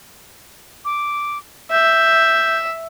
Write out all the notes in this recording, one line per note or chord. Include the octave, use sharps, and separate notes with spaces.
D6
E5 G6